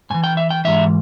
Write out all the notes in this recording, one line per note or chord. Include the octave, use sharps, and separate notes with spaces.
G#2 E3 G#5
G5
E5
G5
G#2 E3 E5